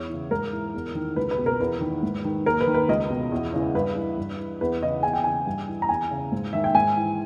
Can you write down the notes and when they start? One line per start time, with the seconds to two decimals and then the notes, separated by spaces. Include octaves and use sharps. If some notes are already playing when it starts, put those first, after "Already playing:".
Already playing: E2 C#5
0.10 C#3 E3
0.31 G#2 A#4
0.53 E3
0.74 E2
0.95 D#3
1.16 C#2 B4
1.31 B4
1.38 B2
1.46 A#4
1.60 E2 B4
1.81 D#3
2.03 G#2
2.25 D#3
2.46 D#2 A#4
2.61 B4
2.67 D#3
2.74 B4
2.89 C#2 D#5
3.10 B2
3.32 E2
3.54 C#3 E3
3.75 G2 B4
3.96 E3
4.17 G2
4.39 E3
4.61 E2 B4
4.81 C#3 E3 D#5
5.03 E2 G#5
5.13 G5
5.24 C#3 E3 G#5
5.46 G2
5.68 E3
5.82 A#5
5.89 E2 G#5
6.11 C#3 E3
6.32 G#2
6.53 D#3 E5
6.64 G5
6.75 G#2 G#5
6.97 E3